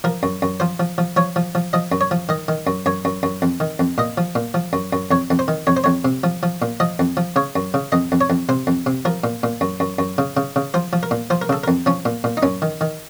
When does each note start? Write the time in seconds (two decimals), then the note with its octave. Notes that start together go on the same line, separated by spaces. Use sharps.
0.04 F3 A#4
0.23 F#2
0.42 F#2
0.60 F3 C5
0.80 F3
0.98 F3
1.17 F3 C#5
1.36 F3
1.55 F3
1.73 F3 D#5
1.92 F#2
2.01 C#5
2.11 F3
2.29 D#3 D#5
2.48 D#3
2.67 F#2
2.86 F#2 C#5
3.05 F#2
3.23 F#2
3.42 F2
3.60 D#3
3.79 F2
3.98 A#2 D#5
4.18 F3
4.35 A#2
4.54 F3
4.73 F#2
4.93 F#2
5.11 F2 C#5
5.30 F2
5.39 C5
5.48 D#3
5.67 F2 C#5
5.77 C5
5.84 F2 C#5
6.05 C3
6.24 F3
6.43 F3
6.62 A#2
6.80 F3 D#5
6.99 F2
7.17 F3
7.36 C#3 C#5
7.56 F#2
7.74 C#3
7.92 F2 D#5
8.12 F2
8.21 C#5
8.30 F2
8.49 C3 C5
8.67 F2
8.86 C3
9.05 F3 A#4
9.24 A#2
9.43 A#2
9.61 F#2
9.80 F#2
9.99 F#2
10.18 C#3
10.37 C#3
10.56 C#3
10.74 F3 C5
10.93 F3
11.03 A#4
11.11 A#2
11.30 F3 C5
11.42 A#4
11.49 C#3 A4
11.64 A#4
11.68 F2
11.86 F3 C#4
12.05 A#2
12.24 A#2
12.37 D#4
12.43 F#2 C#4
12.62 D#3
12.81 D#3